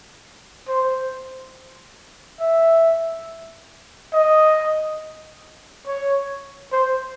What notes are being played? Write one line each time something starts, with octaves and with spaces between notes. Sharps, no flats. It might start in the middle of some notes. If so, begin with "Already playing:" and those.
C5
E5
D#5
C#5
C5